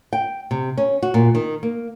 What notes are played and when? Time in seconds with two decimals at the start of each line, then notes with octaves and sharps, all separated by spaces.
0.13 G5
0.51 C3
0.78 C#4
1.02 F#4
1.14 A#2
1.35 D#3
1.63 A#3